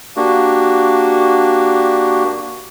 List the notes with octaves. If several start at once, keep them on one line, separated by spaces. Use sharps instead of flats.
A#3 D4 F#4 G4